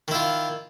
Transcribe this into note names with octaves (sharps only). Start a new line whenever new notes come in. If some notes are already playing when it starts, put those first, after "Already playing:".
D#3 E4 F4